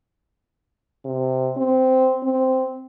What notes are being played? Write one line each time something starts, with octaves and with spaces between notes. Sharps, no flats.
C3
C4
C4